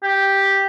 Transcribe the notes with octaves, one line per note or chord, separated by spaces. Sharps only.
G4